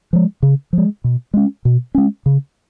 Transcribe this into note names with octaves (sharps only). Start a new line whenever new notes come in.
F3 G#3
C#3
F3 G#3
B2
G#3 C#4
B2
G#3 C#4
C#3